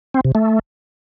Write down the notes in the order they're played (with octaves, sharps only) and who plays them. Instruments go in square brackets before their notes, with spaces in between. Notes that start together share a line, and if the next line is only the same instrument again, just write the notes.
[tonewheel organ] C4
C3
A3